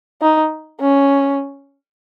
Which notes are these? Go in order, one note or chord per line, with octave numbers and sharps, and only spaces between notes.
D#4
C#4